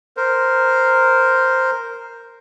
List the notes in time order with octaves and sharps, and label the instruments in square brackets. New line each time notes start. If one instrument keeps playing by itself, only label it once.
[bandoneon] A#4 C5